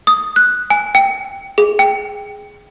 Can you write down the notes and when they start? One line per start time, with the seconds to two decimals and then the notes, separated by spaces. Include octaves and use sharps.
0.07 D#6
0.36 F#6
0.70 G#5
0.95 G5
1.58 G#4
1.79 G5